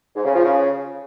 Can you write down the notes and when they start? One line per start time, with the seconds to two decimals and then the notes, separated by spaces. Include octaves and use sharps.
0.15 G#2
0.25 C#3
0.35 F3
0.45 C#3